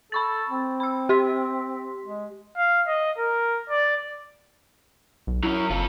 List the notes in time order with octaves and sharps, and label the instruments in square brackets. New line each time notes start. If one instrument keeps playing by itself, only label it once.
[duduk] A4 [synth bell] B5 C#6 A6
[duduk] C4
[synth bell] B5 E6
G4 C6 B6
[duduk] G#3
[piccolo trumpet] F5
D#5
A#4
D5
[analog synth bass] B1
[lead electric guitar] F#3 C#4 [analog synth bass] E4
[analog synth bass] F#1 [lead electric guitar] F4 A4